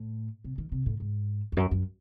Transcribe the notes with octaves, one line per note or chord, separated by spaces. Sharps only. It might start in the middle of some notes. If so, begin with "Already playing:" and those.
Already playing: A2
C3
D#3
C3
A2
G#2
E2
F#2
F#2